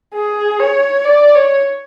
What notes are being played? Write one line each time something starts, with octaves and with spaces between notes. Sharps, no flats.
G#4
C#5
D5
C#5